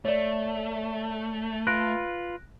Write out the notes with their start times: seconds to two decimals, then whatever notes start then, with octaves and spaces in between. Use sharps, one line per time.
0.05 A3 C#5 D5
1.67 F4 B4 F#6 A#6 D7